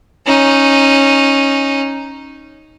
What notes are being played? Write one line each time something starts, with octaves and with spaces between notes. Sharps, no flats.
C#4 D#4